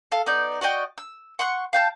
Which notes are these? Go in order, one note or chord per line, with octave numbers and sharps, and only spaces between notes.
A4 F5
B3 D#4 D5 G6
F#4 D5 D#5 G5
E6
F#5 C6 C#6 F#6
F5 G5 A5